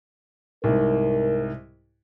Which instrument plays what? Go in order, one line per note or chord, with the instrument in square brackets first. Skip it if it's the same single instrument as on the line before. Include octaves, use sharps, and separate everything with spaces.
[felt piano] C2 G#2 [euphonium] A#4